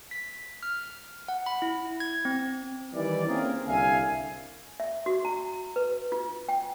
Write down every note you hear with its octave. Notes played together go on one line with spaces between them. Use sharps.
B6
F6
F#5
B5
E4
G#6
C4
D#3 E3 G3 D5
A#3 C4 C#4 G#4 A#4
C2 D3 E5 F5 G#5
E5
F#4
A#5
B4
F4
G5